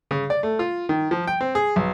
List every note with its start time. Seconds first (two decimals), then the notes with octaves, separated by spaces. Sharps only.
0.11 C#3
0.30 D5
0.43 A3
0.59 F4
0.89 D#3
1.11 F3
1.27 G5
1.41 C4
1.55 G#4
1.76 B1